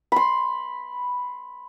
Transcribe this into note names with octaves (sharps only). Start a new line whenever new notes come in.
B5 C6